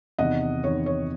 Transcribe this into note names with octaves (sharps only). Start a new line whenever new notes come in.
E2 C3 D#3 D#5 F#5
E2 C3 D#3 C#5
C#5